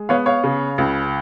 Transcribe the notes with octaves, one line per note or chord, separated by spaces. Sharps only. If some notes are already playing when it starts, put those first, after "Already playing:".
Already playing: G#3
B3 C#5 F5
C#5 F5
C#3
C#2